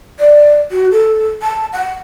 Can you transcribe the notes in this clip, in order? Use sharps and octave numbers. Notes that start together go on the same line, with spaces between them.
D5
F#4
A4
A5
F#5